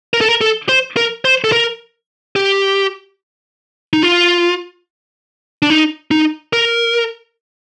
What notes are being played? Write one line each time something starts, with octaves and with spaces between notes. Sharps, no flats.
A#4
A4
A#4
A4
C5
A#4
C5
A4
A#4
G4
D#4
F4
D4
D#4
D#4
A#4